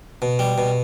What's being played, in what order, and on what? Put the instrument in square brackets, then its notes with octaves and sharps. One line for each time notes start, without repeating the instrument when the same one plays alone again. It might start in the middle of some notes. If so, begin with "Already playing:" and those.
[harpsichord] B2
G3
B2